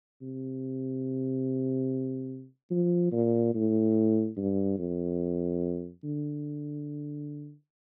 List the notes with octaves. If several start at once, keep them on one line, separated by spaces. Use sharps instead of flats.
C3
F3
A#2
A2
G2
F2
D3